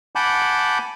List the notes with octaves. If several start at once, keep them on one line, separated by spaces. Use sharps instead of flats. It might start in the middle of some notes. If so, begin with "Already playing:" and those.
F#5 G#5 A5 B5 D6 G6